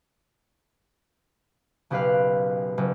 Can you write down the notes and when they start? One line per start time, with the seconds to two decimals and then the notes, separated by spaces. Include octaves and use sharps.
1.90 F#1 B1 G4 B4 F5 F#6
2.78 F#1